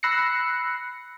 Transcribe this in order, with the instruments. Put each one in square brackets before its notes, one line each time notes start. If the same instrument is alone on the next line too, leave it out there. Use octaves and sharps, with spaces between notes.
[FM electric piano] B5 E6 F#6 A#6 C7 C#7